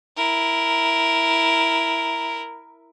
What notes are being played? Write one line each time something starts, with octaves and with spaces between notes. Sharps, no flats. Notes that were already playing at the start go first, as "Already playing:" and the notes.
E4 A#4